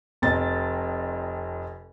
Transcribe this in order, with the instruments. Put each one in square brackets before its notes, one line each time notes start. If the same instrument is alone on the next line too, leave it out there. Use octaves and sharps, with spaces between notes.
[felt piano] F1 F2 A6